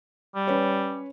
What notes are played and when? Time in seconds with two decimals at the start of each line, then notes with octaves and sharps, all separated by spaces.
0.35 G3
0.47 C#4 B4 C#5